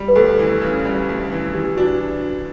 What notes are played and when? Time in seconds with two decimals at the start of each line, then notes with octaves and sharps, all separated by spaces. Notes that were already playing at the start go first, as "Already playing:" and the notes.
Already playing: G3
0.08 B4
0.15 D2 A4
0.39 E3
0.62 C#3
0.85 G3
1.09 D2
1.32 E3
1.54 E3 G4
1.77 D4 F#4